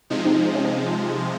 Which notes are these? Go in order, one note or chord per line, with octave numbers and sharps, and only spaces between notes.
C3 F3 G#3 D#4
C4 D#4
D#4
C#4
C4 D#4